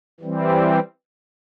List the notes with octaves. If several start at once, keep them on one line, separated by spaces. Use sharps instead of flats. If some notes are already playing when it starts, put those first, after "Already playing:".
E3 G3 C4